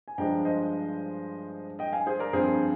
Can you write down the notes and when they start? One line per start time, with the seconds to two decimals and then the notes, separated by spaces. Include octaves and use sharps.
0.08 G#5
0.18 G2 F3 G#3 D4 G5 A#5
0.45 C5 D#5
1.79 D#5 G5
1.92 F5 G#5
2.06 G#4 C5
2.19 A#4 D5
2.33 G2 F3 C4 G#4 C5